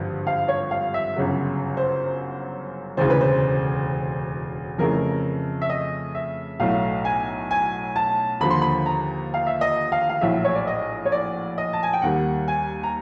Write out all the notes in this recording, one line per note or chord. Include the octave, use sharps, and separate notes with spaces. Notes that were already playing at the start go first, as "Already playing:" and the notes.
Already playing: G#1 G2 D3 F3
F5
C#5
F5
E5
G1 F#2 C#3 F#3
C5
E1 D2 C#3 E3 C5
B4
C5
F2 C#3 E3 A3 A#4
E5
D#5
E5
B1 A2 F#3 A3 F5
G#5
G#5
A5
D#2 D3 F3 B5
C6
B5
A#5
F5
E5
D#5
F5
F5
A#1 A2 F#3 E5
C#5
D5
D#5
C#5
D5
D#5
A5
G#5
G5
D#2 D#3 G3 F#5
G#5
A#5